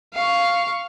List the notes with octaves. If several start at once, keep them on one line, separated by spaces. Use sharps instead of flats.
F5 C#6